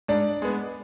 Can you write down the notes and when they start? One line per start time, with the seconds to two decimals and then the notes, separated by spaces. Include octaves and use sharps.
0.08 G#2 D4 D5
0.42 G#3 B3